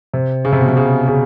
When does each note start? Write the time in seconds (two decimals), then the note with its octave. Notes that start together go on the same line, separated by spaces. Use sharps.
0.13 C3
0.45 C#3
0.52 C3
0.61 B2
0.69 C3
0.77 C#3
1.08 C#3